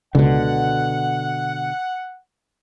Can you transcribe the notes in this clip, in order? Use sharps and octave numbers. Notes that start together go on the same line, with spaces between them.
C#2 B2 D3 F#5